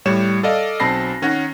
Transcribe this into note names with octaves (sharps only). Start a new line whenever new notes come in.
A2 G3 C#5 E7
A4 D5 D#5 F5
B1 C4 A5 B5 A#6 C7
D#3 C#4 C#5 F#5 A#6